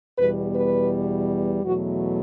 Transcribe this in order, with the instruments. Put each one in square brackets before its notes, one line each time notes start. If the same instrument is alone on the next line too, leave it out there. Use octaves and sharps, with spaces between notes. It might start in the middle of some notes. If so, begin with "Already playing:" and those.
[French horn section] E2 B2 G3 B4
B4
E2 B2 F#3 A3 F#4